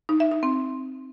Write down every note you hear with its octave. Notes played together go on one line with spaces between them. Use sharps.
D#4
E5
D#4
C4